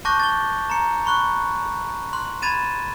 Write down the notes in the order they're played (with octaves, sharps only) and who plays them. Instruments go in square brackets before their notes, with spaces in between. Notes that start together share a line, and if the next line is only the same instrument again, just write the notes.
[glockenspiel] A5 C#6 D6 F#6 G6 A#6
A6 G7
A#5 C#7
B5 C#6 F#6
C6 F#6 F#7
B5 G#6 A6 D#7 E7